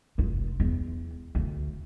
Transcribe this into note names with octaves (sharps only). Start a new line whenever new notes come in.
F1 F4
E2
D2